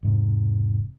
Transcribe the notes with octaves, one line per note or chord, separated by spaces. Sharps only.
E1 G#2 C3